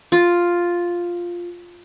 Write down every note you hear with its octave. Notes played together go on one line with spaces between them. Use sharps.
F4